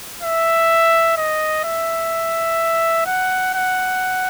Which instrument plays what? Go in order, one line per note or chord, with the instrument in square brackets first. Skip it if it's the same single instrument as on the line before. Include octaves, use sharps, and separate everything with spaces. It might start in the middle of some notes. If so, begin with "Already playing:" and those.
[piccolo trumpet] E5
D#5
E5
F#5
F#5